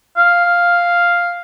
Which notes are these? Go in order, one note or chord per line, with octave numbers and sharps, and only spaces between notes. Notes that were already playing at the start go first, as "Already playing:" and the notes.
F5